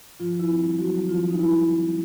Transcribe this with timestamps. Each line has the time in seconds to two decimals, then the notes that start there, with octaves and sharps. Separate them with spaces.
0.20 G2 F3 F4
0.35 D#3 E4
0.49 C4
0.64 G3
0.79 G2 F#3 F#4
0.94 D#3
1.09 F3 C4 F4
1.24 G3
1.31 D#4
1.38 G2 E4
1.53 D#3
1.68 C4
1.83 G3